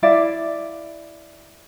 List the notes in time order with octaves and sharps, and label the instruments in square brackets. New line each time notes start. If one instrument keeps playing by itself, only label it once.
[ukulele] E4 D5 F5